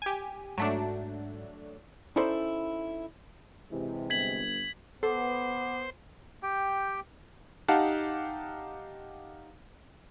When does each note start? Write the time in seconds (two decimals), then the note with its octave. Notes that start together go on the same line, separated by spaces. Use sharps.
0.02 G4 G#5
0.58 G#2 F#3 A3 D4
2.16 C#4 D#4 E4 A4 C5 D5
3.71 C3 E3 G#3
4.10 G1 G#6 B6 F#7
5.03 B3 A4 C5 F#5 D6
6.43 G4 G5
7.68 D#4 G4 F5 F#5 A5